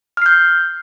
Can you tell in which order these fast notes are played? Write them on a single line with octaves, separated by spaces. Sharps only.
F6 C7 G6